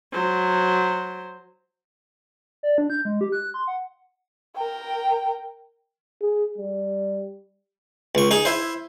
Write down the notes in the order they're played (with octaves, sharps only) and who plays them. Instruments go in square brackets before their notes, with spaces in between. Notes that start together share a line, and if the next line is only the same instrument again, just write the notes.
[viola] F#3 C5
[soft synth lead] D5
D4
G6
G#3
G4
F#6
C6
F#5
[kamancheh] A#4 G5
[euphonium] G#4
G3
[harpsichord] C#2 C#6
D#4 G#4
E4 C5